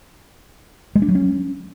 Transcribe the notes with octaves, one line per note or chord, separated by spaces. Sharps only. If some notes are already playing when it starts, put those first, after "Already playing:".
G#3
D4
F#3
C#4